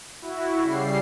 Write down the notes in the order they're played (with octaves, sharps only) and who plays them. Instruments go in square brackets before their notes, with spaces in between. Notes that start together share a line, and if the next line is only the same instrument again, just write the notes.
[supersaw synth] E4 F#4
C#3 G3 C7